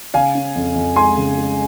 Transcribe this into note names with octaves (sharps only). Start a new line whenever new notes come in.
C#3 F5 G#5
C#4
F2
F2
G#3 G#5 C6
C#3
G#3